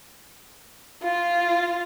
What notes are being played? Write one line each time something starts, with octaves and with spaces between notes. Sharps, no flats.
F4